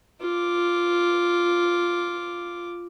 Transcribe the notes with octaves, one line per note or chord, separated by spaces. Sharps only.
F4 D6